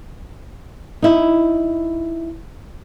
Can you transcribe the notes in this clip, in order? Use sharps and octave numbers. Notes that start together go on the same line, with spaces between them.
D#4 E4